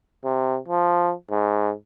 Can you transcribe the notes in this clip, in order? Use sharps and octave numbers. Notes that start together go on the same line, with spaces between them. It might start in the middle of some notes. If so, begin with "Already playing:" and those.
C3
F3
G#2